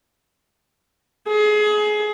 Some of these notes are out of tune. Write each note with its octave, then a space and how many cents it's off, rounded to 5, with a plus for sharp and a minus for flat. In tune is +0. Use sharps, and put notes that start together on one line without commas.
G#4 +25